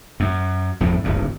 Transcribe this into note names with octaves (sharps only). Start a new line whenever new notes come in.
F#2
G#1 F2 A2
D1 G#1 G2